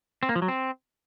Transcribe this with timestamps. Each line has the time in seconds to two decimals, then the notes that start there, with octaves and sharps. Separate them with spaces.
0.23 C4
0.29 A#3
0.35 F3
0.42 F#3
0.48 C4